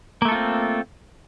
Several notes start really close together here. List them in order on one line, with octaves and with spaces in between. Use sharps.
A#3 A3 A4 F4 C4